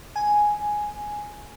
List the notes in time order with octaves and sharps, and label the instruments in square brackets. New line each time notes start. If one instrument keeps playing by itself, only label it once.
[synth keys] G#5